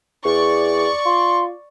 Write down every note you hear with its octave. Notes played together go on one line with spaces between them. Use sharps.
E2 D5 C#6
F4 C6